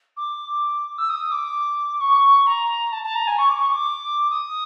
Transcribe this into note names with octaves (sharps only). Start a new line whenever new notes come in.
D6
E6
D#6
D6
C#6
A#5
A5
A5
A#5
G#5
C#6
D6
C#6
D6
D#6